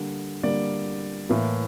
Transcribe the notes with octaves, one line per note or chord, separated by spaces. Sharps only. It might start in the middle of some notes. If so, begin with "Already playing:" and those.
Already playing: D3 G3 A#3
D3 G3 A#3 D5
A2 E3 A#3